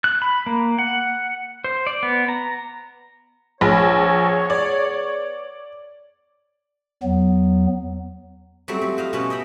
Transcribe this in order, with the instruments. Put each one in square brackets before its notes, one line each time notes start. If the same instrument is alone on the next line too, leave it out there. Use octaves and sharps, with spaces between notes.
[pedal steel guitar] F#6
B5
A#3
F#5
C5
D5
B3
A#5
[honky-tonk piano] A#1 [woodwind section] B3 G#4 C#5
[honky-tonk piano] D5
[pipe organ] E2 F#3 B3
[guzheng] F#3 G3 A3 C4 F#4
F3 G3
B4 C5 D#5 F5
B2 C#4 F#4 B4 A5 B5
D#5 E5 G5 B5